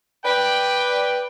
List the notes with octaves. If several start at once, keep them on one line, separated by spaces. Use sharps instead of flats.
B4 D5 G5